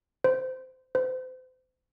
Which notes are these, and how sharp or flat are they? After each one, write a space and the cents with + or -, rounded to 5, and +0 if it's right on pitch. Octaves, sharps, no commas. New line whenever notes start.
C5 -20
C5 -35